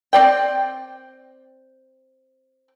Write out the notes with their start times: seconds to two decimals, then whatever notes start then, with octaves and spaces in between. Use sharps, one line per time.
0.13 C4 D5 G5